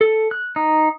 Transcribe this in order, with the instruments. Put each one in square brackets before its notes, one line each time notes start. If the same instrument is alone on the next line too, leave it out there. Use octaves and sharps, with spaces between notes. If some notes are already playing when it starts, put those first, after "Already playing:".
[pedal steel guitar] A4
F#6
D#4